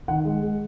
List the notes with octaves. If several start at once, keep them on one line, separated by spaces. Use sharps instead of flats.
D#3 F#5
G#3
G#3